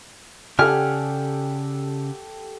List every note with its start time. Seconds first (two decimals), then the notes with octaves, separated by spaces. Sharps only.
0.59 C#3 G4 A4 D5 F#5 G#5 F6